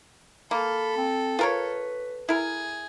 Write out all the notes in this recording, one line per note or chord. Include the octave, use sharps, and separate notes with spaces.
A#3 A4 B5
C4
F4 A#4 B4 C#5
E4 G#4 A#4